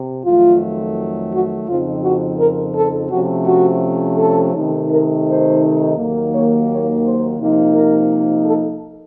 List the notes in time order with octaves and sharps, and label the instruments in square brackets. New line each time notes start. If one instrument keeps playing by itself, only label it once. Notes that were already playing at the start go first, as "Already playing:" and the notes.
Already playing: [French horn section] C3
F2 D#3 F#3 A3 F4
F#4
F2 C#3 F3 C4 D#4 F4
F#4
A#4
A4
C3 F3 A3 C#4 F#4
F#4
A4
C3 D#3 A3 D#4
A#4
C5
D#2 D#3 F#3 A#3
C#5
C#5
C5
C3 F3 A#3 D#4
A#4
A4